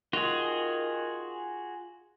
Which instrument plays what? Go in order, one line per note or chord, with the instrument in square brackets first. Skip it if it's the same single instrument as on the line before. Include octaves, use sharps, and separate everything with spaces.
[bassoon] D#3 [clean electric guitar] F4 [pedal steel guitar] F#4 G#4